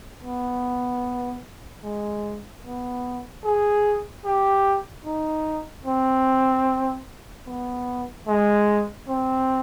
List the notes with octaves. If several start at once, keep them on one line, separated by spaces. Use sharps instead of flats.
B3
G#3
B3
G#4
G4
D#4
C4
B3
G#3
C4